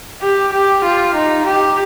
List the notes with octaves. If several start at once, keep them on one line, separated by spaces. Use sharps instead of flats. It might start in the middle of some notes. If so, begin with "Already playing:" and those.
G4
G4
F4
D#4
G4